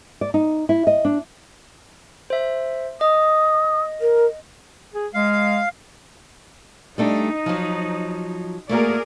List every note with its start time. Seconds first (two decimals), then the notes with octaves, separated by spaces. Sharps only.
0.21 D5
0.34 D#4
0.69 E4
0.87 D#5
1.05 D4
2.30 C5 E5
3.01 D#5 D#6
4.01 A#4
4.94 G#4
5.14 G#3 F5
6.98 G3 A3 D4 D#4
7.46 F3 F#3
8.69 A3 A#3 F#4 G#4 A#4 D5